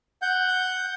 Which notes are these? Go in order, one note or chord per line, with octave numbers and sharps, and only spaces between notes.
F#5 G6